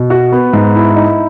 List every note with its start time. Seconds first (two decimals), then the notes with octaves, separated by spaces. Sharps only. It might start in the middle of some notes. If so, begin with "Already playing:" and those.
Already playing: B2
0.10 F#4
0.32 B3
0.53 G#2
0.75 E4
0.96 D#4